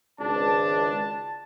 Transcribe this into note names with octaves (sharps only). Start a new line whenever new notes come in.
G#1 C#2 D4 A5